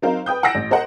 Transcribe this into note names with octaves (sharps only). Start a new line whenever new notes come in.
F#3 C4 D#4 A#4 C5 F5
B4 G5 D#6 G6
F#5 G#5 E6 A#6 D7
A1
A#4 C5 D#5 F#5